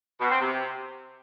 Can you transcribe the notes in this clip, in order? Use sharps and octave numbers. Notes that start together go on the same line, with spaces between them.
B2
C4
C3